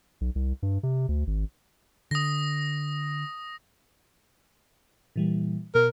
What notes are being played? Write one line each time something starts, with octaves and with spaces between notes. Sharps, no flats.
B1
C2
G2
C3
D2
G#1
D3 D#6 A#6
A#2 E3 G3
B2 A#4